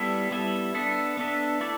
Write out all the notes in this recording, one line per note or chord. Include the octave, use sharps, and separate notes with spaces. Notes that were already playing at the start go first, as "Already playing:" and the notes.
Already playing: G3 B3 E4 A4 E5
G3 B3 E4 A4 E5
B3 D4 A4 E5
B3 D4 A4 E5
A3 E4 A4 D5